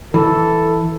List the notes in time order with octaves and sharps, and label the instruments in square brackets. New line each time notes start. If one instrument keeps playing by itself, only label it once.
[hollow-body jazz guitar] E3 [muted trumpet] A4